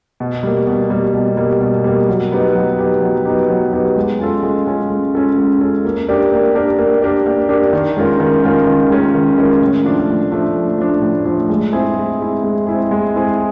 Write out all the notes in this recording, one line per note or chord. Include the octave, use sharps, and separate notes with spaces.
B2
G3 A#3
B2
G3 A#3
B2
G3 A#3
B2
G3 A#3
F#3
B3 D#4 G4
F#3
B3 D#4 G4
F#3
B3 D#4 G4
F#3
B3 D#4 G4
G#3
C#4 F4 A4
G#3
C#4 F4 A4
G#3
C#4 F4 A4
G#3
C#4 F4 A4
A#3
D4 G4 A#4 D5
A#3
D4 G4 A#4 D5
A#3
D4 G4 A#4 D5
A#3
D4 G4 A#4 D5
D#3
G#3 C#4 F4 A#4
D#3
G#3 C#4 F4 A#4
D#3
G#3 C#4 F4 A#4
D#3
G#3 C#4 F4 A#4
A2
F3 A3 D4
A2
F3 A3 D4
A2
F3 A3 D4
A2
F3 A3 D4
G#3
C4 E4 G#4
G#3
C4 E4 G#4
G#3
C4 E4 G#4
G#3
C4 E4 G#4